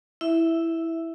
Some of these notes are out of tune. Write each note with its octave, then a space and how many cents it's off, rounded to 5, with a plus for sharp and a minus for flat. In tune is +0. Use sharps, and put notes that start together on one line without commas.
E4 +0 E5 +0